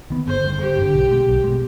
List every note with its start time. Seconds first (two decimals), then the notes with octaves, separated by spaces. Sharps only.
0.10 D#3 B3
0.27 G1 C5
0.44 G2 D3
0.60 G1 G4
0.77 G2
0.82 D3
0.94 B1
1.11 B2 G#3
1.27 B1
1.44 B2 G#3